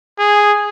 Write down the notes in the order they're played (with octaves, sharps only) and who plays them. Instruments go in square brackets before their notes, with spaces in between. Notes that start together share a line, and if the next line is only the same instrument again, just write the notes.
[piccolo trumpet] G#4